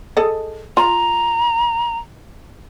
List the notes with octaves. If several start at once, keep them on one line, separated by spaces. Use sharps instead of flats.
G#4 A4 D#5
F4 A#5